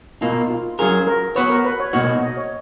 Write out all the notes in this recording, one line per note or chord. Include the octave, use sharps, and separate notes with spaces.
B2 A#3 D#4 F4
F4
F#3 C#4 F4 G#4 A#4
A#4
B3 F#4 B4 C#5
A#4
B4
C#5
B2 A#3 D#4 F#4 C#5
D#5
C#5